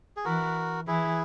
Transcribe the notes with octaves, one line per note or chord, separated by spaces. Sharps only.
G#4
E3 F#4 A#4
E3 E4 G#4